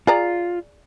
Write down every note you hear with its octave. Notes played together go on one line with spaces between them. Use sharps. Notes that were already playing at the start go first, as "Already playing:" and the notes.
F4 G#4 D5 A#5